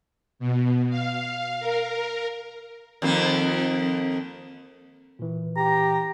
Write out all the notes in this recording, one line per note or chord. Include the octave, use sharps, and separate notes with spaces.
B2
F5
A#4
F2 D#3 A#3
A#2 E3
G4 A#5